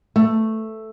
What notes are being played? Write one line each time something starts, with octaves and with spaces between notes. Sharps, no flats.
A3